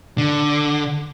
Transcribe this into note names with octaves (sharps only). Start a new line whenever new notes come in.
D3